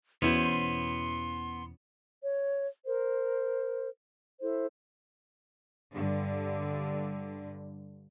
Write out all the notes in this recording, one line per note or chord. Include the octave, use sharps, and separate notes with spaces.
E2 B2 B3 C#4 E4 C5 C6
C#5
A#4 C5
E4 A4 C5
G2 D3